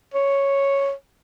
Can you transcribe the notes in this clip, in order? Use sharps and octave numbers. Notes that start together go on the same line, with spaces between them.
C#5